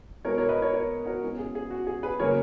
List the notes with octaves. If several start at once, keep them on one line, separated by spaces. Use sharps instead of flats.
B2 G#3 B3 A#4 C#5
A#4 C#5
B4 D#5
A#4 C#5
A#4 C#5
F#4 A#4
B2 G#3 C#4
G#4
G#4
F#4
G#4
G#4 B4
C#3 F#3 A#3 C#4 A#4 C#5